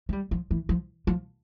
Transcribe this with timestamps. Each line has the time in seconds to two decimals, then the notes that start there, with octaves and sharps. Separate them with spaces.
0.09 A3
0.13 G3
0.31 F3
0.51 E3
0.69 F3
1.07 F3